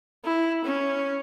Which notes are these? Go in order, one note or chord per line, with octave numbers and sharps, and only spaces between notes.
E4
C#4